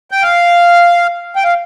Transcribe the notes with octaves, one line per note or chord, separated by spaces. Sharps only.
G5
F5
G5
F5